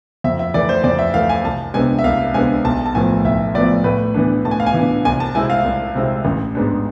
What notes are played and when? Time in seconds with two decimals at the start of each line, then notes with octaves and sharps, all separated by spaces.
0.24 F2 E5
0.39 E5
0.54 E3 A3 D5
0.69 C5
0.84 F2 D5
0.99 E5
1.14 E3 A3 F5
1.29 G#5
1.44 C2 A5
1.74 C3 G#3 B3 D4 G#5
1.99 E5
2.04 C2 F5
2.34 C3 G#3 B3 D4 G#5
2.65 B1 A5
2.86 A5
2.95 A2 F3 B3 G#5
3.24 B1 E5
3.54 A2 F3 B3 D5
3.84 A2 B4
4.14 E3 B3 D4
4.45 A2 A5
4.51 G#5
4.60 F5
4.66 G#5
4.74 E3 B3 D4
5.05 C2 G#5
5.20 A5
5.35 C3 G#3 C4 E4 G#5
5.50 F5
5.65 C2
5.95 C3 G#3 C4 E4
6.25 A1
6.55 G#2 G#3 B3 D4